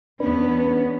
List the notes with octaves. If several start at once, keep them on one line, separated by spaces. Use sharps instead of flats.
E2 B3 C#4 D4 B4